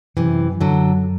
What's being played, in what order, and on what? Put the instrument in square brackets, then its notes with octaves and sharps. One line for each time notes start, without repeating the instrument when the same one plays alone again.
[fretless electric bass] F#2 [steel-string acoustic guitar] C3 E3
[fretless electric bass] F#2 [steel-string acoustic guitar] D3 F#3